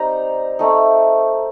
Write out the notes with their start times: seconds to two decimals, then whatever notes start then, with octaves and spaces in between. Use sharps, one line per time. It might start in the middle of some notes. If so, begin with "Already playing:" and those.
Already playing: G3 C4 D#4 A#5
0.59 A3 C4 D#4